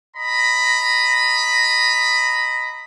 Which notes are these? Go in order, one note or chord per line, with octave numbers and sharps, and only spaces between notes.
D#5 A#5 B5